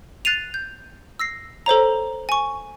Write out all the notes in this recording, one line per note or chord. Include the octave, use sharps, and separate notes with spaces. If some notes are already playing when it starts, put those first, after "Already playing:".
F#6 A6 C7 D#7 F7
G6
E6 A#6 C7
A4 C5 C#5 A#5
G#5 C#6